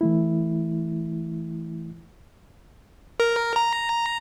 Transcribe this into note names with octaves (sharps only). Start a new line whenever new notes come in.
E3 A3 E4
A#4
A#5